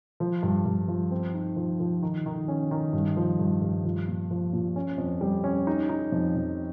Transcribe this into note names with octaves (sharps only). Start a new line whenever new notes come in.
F3
G2
G2
F3
C4
D#4
F3
F3
D#3
D#3
C#4
D#3
G2
F3
G2
G2
F3
A#2
F3
A#2
C#4
F2
G3
C#4
D#4
D#4
F2
F2